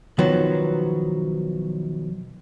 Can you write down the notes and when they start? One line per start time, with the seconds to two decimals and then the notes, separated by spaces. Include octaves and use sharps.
0.18 B1 D#3 F3 F#3 B3